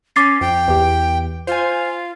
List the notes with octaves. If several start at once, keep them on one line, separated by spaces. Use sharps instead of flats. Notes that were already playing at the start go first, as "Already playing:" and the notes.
C#4 D6 A6 C7
F2 G5
E2 G4
F4 C5 G#5